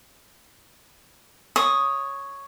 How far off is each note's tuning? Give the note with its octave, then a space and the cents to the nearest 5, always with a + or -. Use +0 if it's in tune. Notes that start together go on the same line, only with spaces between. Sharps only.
C#5 +0 D#6 +0